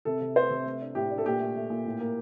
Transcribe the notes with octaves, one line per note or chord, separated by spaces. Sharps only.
C3 A4
C3
A3 C5
C3
A3
D4
A2 G4
D4
A4
A#2 G4
A3
A3
A#2
A2
A#3